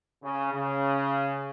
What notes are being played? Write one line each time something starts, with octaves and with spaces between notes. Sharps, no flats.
C#3
C#3